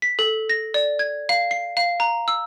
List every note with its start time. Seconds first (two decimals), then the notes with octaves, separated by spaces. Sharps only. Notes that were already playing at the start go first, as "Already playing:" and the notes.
0.02 B6
0.19 A4
0.49 A#6
0.74 D5
0.99 G#6
1.29 F5
1.51 C7
1.77 F5
2.00 A#5
2.28 E6